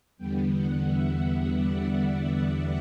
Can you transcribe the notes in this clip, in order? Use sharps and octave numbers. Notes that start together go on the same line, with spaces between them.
E2 D3 G3 B3 G5
F#5
E5
D5
E5